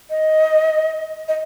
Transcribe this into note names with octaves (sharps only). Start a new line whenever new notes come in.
D#5
D#5